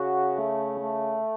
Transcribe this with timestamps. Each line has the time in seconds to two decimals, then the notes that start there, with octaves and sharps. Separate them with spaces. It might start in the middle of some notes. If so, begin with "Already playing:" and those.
Already playing: C#3 F#4
0.37 A3
0.81 A3